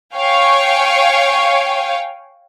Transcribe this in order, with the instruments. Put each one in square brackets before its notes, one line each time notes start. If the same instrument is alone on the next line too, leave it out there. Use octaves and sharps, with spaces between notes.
[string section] C#5 F5 G5 G#5 C#6